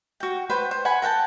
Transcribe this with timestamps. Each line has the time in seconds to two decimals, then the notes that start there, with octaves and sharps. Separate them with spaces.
0.20 F#4 G5
0.49 B4 C5 F#5 G5
0.71 C5
0.85 F#5 G#5 B5
1.02 A#4 F#5 G5 A5